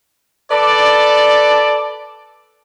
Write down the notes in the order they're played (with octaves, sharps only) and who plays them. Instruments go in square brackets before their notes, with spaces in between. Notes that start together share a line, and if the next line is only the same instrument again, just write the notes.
[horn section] A4 B4 D5